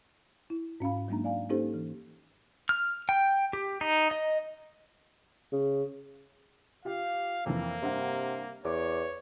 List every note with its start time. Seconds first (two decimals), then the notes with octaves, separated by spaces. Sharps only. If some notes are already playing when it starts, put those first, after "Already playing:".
0.50 E4
0.80 G#2 C#4 F5 B5
1.08 F#3 G#3 A#3 D4 D#4 A#5
1.24 D5 F5 G#5
1.49 A#3 C#4 D#4 G4 A4 C5
1.74 E3
2.69 F6
3.09 G5
3.53 G4
3.81 D#4
4.11 D#5
5.52 C#3
6.85 F4 G4 F5
7.46 F2 E3 A#3
7.82 G2 C3 F#5
8.65 E2 C#5 D6